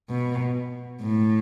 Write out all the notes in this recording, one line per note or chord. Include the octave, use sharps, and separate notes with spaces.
B2
A2